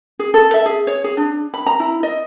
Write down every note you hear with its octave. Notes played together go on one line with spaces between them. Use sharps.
G#4
A4
E5
G#4
C#5
G#4
D4
B5
A#5
E4
D#5